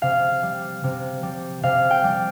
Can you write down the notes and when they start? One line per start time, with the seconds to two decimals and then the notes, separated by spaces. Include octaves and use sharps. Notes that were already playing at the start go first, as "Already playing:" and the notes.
0.02 C3 F5
0.43 G3
0.84 C3
1.23 G3
1.63 C3 F5
1.90 G5
2.04 G3